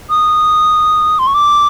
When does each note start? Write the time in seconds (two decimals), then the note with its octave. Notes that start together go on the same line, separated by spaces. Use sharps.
0.10 D#6
1.19 C6
1.27 C#6
1.34 D6